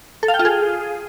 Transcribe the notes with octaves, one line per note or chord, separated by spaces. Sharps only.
A4
F5
G5
F4
G#4